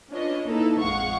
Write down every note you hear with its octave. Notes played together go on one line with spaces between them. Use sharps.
C#4 D4 F4 B4 C#5 D#5
A#3 D#4 E4 A4 B4
A1 F2 G#3 F5 F#5 C#6